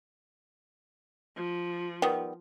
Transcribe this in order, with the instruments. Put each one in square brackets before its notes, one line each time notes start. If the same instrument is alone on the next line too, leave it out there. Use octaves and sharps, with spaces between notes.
[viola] F3
[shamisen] D#3 G3 B3